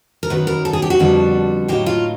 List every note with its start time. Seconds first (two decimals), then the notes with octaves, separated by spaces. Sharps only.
0.23 A#4
0.30 F#2 D#3 F#3 B3 B4
0.47 A#4
0.65 A4
0.73 G#4
0.82 G4
0.90 F#4
0.99 F2 D3 G3 B3 D4
1.68 A2 F#3 A#3 D#4 G4
1.86 F4